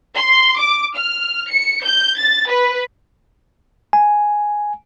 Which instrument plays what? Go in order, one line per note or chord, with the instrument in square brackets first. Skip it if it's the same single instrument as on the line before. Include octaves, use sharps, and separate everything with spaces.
[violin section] C6
D6
F6
C#7
G6
A6
B4
[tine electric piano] G#5